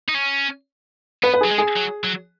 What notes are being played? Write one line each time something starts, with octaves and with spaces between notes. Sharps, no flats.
D#4
C#4
B3 B4
B4
F#3 G#4
G#3
G#4
F#3
F#3